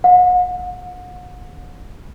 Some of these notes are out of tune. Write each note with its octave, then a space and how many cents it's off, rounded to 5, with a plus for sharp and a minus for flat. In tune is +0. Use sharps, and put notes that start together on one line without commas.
F#5 -40